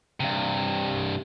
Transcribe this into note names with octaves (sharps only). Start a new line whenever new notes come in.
G2 C3